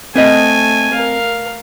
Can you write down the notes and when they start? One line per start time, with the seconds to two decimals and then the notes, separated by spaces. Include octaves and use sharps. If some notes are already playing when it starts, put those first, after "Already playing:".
0.16 A3 C4 B4 D#5 G#5
0.93 A#4 F5